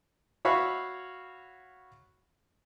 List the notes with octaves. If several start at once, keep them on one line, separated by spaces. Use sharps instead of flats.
F#4 C#5 E5 F5 B5 C#6